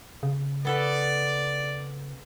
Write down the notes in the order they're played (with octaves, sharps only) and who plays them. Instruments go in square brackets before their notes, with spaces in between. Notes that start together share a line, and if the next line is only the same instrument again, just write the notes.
[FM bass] C#3
[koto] B3 A4 B4 [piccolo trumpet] D5